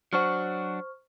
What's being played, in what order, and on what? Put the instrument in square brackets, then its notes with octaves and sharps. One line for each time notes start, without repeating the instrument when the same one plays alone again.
[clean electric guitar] F#3 D4 F#4 [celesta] C5 C#6 F6